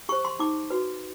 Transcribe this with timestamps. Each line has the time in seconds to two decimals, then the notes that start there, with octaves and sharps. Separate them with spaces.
0.09 G4 C5 C#6
0.25 C6
0.39 D#4 D6
0.70 F#4 B4